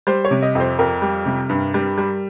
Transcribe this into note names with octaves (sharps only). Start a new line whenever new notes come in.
G3 C5
C#5
C3
D#5
F2 C5
F2 A#4
G3
C3
G2
G3
G3